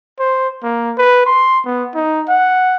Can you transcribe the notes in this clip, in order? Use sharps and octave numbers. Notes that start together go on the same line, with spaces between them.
C5
A#3
B4
C6
B3
D#4
F#5